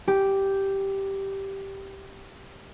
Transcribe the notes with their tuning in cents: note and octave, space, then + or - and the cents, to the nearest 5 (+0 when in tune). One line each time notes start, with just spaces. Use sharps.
G4 -5